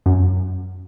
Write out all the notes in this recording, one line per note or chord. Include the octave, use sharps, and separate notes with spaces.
F#2